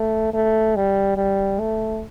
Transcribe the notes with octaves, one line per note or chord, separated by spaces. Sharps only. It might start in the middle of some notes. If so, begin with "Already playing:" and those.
Already playing: A3
A3
G3
G3
A3